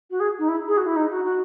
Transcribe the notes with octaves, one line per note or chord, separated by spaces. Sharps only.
F#4
G#4
D#4
E4
G#4
F#4
E4
D#4
F#4
F#4